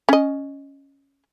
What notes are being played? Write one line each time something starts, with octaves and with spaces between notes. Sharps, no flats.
C#4 D#5